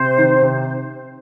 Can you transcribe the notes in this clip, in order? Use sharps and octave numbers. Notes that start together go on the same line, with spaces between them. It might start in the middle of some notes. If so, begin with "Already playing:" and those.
Already playing: C3 C5
D#3
C3